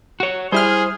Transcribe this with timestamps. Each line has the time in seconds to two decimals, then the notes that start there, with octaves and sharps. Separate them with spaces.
0.20 F#4 C#5
0.52 G3 E4 G#4 C5 F6